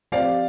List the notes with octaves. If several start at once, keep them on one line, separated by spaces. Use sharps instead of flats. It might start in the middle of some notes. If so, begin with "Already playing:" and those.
F3 C4 G4 D5 F5